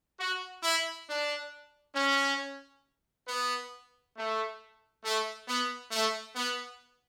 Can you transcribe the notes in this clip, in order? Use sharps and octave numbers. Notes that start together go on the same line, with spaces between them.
F#4
E4
D4
C#4
B3
A3
A3
B3
A3
B3